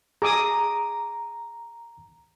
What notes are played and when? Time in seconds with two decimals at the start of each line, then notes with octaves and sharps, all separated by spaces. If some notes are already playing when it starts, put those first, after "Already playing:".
0.22 G#4 A#5 D6 D#6